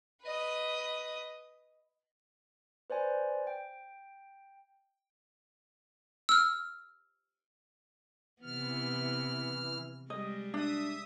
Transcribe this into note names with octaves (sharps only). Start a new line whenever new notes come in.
B4 D#5
B4 C5 D5 G#5
G5
E6 F6
C3 E3 B3 F6
G3 G#3 D#5
D4 E5 D#6